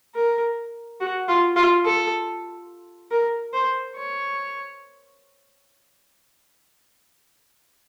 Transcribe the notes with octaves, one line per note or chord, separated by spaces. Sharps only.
A#4
F#4
F4
F4
A4
A#4
C5
C#5